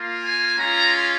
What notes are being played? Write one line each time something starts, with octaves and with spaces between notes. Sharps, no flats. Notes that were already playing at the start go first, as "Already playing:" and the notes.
Already playing: A#3 F4
G#5
G#3 C#4 F4 A#5